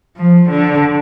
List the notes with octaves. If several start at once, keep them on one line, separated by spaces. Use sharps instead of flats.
F3
D3